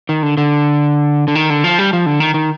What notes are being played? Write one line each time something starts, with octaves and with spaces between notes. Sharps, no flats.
D#3
D3
D3
D3
D#3
D3
F3
G3
F3
D3
D#3
D#3